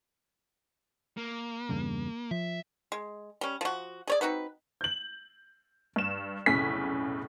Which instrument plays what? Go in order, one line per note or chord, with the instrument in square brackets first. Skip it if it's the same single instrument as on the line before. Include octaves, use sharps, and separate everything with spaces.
[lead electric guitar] A#3
[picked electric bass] E2 G2 C#3
[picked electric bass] F3 [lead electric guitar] E5
[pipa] G#3
G3 C#4
F3 F#4
G#4 C#5 D5
C4 D#4 F#4 B4
[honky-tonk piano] G6 F#7
G2 E7
F1 B1 A2 C#3 G#5 B6